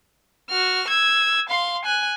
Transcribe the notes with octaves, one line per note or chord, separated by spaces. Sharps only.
F#4 F6
E6 G#6
F5 C6
G#5 F#6